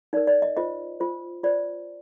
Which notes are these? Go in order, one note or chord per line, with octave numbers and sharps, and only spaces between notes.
D#4 A#4 D5
D5
D#5
F4 C5 D#5
F4 C5
F4 C5 D5